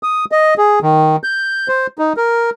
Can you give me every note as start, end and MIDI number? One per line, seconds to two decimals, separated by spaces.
0.03 0.25 87
0.32 0.54 75
0.58 0.79 68
0.82 1.16 51
1.24 1.68 91
1.68 1.87 72
1.99 2.13 63
2.17 2.50 70